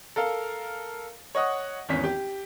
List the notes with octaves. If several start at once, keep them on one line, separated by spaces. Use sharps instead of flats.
A4 A#4 F5
C#5 D#5 F#5 D#6
G#1 E2 C#4 B6
G4